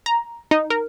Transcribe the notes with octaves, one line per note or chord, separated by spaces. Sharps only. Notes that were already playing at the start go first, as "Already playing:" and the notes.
A#5
D#4
A#4